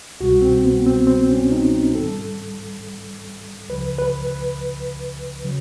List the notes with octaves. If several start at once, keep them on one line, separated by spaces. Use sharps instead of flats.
C2 B2 G3 F#4
C4
B3
C4
C4
C#4
D#4
G#2 D#3 G3 A4
C#2 C#3 F3 B4
B4
B4
C#3 F#3